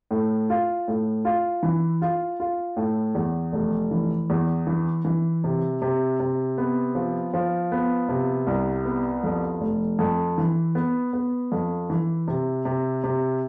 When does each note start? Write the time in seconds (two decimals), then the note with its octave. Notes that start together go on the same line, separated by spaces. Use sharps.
0.11 A2
0.50 F4
0.88 A2
1.25 F4
1.63 E3
2.02 F4
2.40 F4
2.77 A2
3.15 E2
3.53 F1
3.91 E3
4.30 E2
4.67 E3
5.05 E3
5.44 C3
5.82 C3
6.20 C3
6.58 B3
6.95 F3
7.34 F3
7.72 B3
8.09 C3
8.47 C2
8.85 B3
9.24 F2
9.61 F1
9.99 F2
10.38 E3
10.75 B3
11.13 B3
11.52 F2
11.90 E3
12.28 C3
12.65 C3
13.04 C3